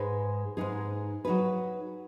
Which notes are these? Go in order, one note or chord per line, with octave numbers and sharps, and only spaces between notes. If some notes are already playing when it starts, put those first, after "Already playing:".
Already playing: G#2 G#3 D#4 G#4 B4
G#2 G#3 D#4 G#4 B4
F#3 D#4 G#4 B4